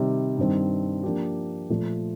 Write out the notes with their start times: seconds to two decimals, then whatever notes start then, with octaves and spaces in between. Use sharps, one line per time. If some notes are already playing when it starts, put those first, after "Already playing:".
Already playing: C3 D#3 G3
0.38 G2 D#3 G3 C4
1.03 F3 A#3 D4 G4
1.70 A#2 F3 A3